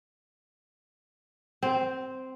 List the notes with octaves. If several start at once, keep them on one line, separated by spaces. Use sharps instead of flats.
C4